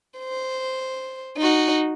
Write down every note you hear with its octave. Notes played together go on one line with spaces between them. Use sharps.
C5
D#4 F#4